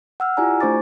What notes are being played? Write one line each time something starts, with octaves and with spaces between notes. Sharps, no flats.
F#5 E6 F6
E4 F4 G4 D5 G#5 A#5
A3 D4 C5 C#6 D6 A6